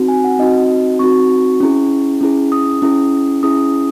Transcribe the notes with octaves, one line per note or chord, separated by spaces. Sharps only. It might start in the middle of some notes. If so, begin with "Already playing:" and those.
Already playing: C4 D#4 F#4
G#5
F#5
C4 D#4 F#4 D#5
C4 D#4 F#4 C#6
C#4 E4 G#4
C#4 E4 G#4
D#6
C#4 E4 G#4
C#4 E4 G#4 D#6